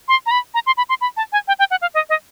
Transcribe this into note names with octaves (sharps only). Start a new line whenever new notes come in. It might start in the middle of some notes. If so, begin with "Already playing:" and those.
C6
A#5
B5
A#5
C6
B5
C6
B5
A5
G#5
G5
G5
F#5
F5
D#5
D#5